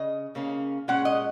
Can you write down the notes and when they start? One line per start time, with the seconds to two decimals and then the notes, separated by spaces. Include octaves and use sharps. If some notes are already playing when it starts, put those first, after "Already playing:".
Already playing: C#3 D#5
0.35 C#3 A#3 C#4
0.88 A#2 G#3 C#4 F#5
1.05 D#5